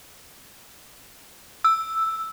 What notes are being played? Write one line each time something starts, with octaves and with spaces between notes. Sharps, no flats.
E6